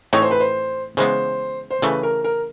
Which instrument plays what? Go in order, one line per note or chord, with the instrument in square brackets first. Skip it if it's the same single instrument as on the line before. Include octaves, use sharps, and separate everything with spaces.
[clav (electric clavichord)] A2 E3 A3 C4 D#4 [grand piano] C#5
[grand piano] C5
B4
C5
[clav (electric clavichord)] C#3 E3 G#3 B3 [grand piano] C5
[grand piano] C5
[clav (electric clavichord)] C#3 E3 A3 [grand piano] B4
[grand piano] A#4
A#4